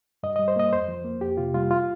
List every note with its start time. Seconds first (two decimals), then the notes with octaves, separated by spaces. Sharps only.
0.23 G2 D#5
0.36 G3 D#5
0.48 C5
0.56 A#3 D#5
0.72 F2 C5
0.88 F3
1.05 A#3
1.21 F2 G4
1.37 C3 F4
1.54 G3 F4
1.71 F4